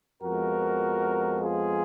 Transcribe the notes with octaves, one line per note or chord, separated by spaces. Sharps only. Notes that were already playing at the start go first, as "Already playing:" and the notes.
F2 F3 G#3 B3 F#4 A#4
F4 G#4